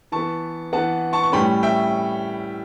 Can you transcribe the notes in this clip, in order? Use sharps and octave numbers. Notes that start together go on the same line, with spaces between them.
E3 B3 A5 C#6
E3 B3 F#5 A5
A5 C#6
C#6
A2 G3 C#4 G5 B5
E5 G5